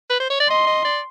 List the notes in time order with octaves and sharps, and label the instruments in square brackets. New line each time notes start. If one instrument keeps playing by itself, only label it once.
[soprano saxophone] B4
C5
C#5
D5
[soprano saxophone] D#5 [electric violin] C6
[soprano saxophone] D#5
D5